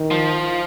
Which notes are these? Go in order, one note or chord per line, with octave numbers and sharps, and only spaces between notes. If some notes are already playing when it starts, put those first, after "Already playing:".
Already playing: D#3
F3